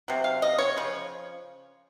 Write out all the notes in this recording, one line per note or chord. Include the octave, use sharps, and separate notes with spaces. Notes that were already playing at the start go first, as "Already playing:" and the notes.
C3 F#3
F5
D#5
C#5
C#3 F3